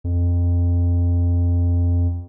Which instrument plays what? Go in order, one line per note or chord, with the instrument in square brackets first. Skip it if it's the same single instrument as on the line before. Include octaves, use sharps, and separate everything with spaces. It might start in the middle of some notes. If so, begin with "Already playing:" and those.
[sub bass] F2